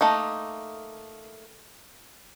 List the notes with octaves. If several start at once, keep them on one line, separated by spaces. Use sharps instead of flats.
A3 A#3 D#4